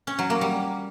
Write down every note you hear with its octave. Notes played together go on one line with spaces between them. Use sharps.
C#4
F#3
A#3
G3